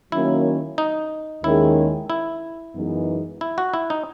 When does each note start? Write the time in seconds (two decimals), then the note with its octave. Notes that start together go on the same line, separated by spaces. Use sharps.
0.12 D#3 F#3 A#3 C#4 E4
0.78 D#4
1.44 D#2 D#3 G#3 C#4 E4 G#4
2.10 E4
2.75 F#2 E3 G#3 B3 D#4
3.41 E4
3.58 F#4
3.74 E4
3.90 D#4